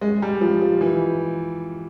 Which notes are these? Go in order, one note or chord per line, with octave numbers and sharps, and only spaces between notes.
G#3
G3
F3
F3
E3